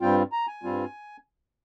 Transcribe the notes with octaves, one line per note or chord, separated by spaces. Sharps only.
G2 G3 C4 F4 G5
A#5
G#5
G2 G3 C4 F4